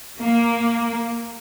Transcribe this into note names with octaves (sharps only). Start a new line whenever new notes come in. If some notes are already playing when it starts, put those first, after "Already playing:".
A#3